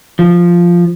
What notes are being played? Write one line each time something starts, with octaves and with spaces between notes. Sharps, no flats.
F3